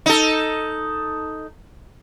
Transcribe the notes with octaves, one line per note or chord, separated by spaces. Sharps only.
D#4 A4